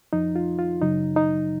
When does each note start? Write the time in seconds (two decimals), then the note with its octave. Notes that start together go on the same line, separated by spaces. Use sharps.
0.13 F2 F3 D#4
0.36 F4
0.59 F4
0.82 F#2 C#3 F#3 D#4
1.16 D#4